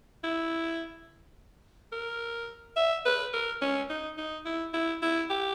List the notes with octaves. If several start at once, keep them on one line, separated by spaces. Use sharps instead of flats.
E4
A#4
E5
B4
A#4
C#4
D#4
D#4
E4
E4
E4
G4